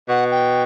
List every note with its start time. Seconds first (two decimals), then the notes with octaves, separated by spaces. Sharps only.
0.09 B2 F#5
0.31 G5